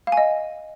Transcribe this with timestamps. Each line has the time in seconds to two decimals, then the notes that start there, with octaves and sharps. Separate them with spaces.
0.07 F5
0.12 G#5
0.17 D#5